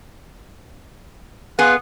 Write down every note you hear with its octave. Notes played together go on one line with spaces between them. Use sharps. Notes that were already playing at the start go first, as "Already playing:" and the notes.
B3 G#4 F5 C6 F#6